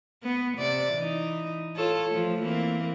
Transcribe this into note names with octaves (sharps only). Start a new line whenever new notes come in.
B3
C3 D5
E3 D#4
F4 A4 C#5
F3 A3
E3 A#3 C4